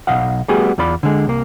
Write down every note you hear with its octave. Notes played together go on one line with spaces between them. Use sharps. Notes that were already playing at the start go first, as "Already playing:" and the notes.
B1 D#5 F5 F#5
G3 A3 B3 F#4 G#4
E2 F4 D5 B5
D3 G#3
C2 A#3